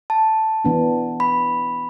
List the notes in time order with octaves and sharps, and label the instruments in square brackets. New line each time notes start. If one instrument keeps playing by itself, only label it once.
[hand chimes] A5
[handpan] E3 B3 D4
[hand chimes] B5